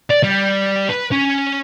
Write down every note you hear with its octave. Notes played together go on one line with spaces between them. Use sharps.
D5
G3
B4
C#4